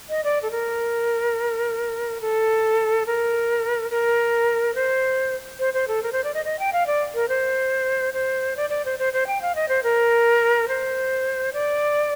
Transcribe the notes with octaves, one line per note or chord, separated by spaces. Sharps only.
D#5
D5
A4
A#4
A4
A#4
A#4
C5
C5
C5
A4
A#4
C5
D5
D#5
D#5
G5
F5
D5
A#4
C5
C5
D5
D5
C5
C5
C5
G5
F5
D#5
C5
A#4
C5
D5